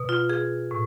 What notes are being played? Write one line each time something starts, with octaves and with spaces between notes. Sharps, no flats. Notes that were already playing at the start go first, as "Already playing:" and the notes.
Already playing: B2
F4
G#4
A2